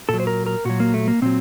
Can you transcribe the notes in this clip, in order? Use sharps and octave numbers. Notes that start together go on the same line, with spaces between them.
A#2 F#3 A4
C5
A#4
A#4
A#2 F#3 F#4
A#3
A3
A#3
A#2 F#3 C4